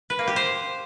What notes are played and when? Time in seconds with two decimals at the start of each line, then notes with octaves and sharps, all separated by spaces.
0.10 B4
0.19 A#3
0.27 G4
0.36 C5